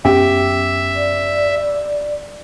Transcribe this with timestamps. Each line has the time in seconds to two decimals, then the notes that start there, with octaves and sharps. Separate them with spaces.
0.05 F#2 B3 C#4 G4 E5
0.96 D5